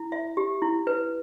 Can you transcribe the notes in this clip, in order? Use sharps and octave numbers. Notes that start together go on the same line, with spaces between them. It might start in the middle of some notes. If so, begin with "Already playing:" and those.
Already playing: E4
E5
G4
E4
B4